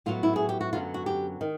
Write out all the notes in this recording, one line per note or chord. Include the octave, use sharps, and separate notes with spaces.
A2 F#3 B3 F4
E4
G#4
G4
F#4
F#2 D3 F#3 B3 F4
F#4
G4
D#3